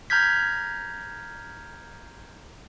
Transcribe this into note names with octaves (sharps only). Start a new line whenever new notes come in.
A#5 F6 G6 G#6 B6